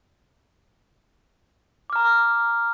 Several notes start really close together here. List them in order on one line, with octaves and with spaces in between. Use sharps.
D6 F6 A#5